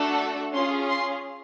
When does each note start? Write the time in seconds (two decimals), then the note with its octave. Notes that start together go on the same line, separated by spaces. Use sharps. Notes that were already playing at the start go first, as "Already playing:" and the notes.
Already playing: A3 D4 F#4 A4
0.52 C#4 F4 G#4 C6
0.89 C6